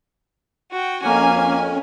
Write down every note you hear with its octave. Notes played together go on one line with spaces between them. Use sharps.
F#4 G5
F2 A#3 C#4 G#5